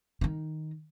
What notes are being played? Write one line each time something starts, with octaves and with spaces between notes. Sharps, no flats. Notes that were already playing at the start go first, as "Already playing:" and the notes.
D#3 D#4